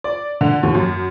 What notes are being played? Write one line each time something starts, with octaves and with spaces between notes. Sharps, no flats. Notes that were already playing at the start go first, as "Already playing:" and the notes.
D5
D3
D#2
F#2